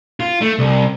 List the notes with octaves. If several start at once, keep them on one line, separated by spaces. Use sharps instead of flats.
F4
A3
C2